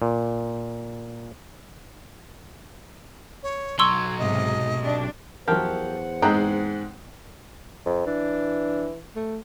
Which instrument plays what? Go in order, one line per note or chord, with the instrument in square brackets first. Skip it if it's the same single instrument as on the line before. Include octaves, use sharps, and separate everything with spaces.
[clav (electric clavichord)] A#2
[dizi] C#5
[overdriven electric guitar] B1 F#3 [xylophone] C6 C#6 E6 [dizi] G#6
[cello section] G#2 C3 [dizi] D#5
[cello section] C3 D4
[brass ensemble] E2 C5 F#5 [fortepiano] F3 F#3 [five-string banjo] G4 A#4
[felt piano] G#2 G#3 [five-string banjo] C4 A#5 [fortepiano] G5 D#6 F#6
[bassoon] F2
[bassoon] E3 [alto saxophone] D4
[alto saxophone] A3